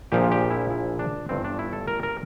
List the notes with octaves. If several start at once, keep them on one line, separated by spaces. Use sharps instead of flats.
A#1 A#2 F3 G4
G4
E4
E4
D4
G1 G2 E3 C4
D4
E4
A4
A#4
A#4